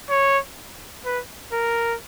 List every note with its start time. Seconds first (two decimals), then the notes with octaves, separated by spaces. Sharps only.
0.10 C#5
1.05 B4
1.53 A#4